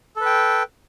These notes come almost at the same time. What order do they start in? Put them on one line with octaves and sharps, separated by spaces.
A4 B4 G5